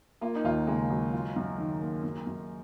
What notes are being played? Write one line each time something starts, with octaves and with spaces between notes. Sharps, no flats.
A#3 F4
D#4
D#2 F4
C#3 G#3
F#3
F4
F#2
D#3
A#3
F#2
F#2